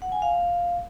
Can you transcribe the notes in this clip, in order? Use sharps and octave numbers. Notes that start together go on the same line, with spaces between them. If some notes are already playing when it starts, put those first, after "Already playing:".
F#5
G#5
F5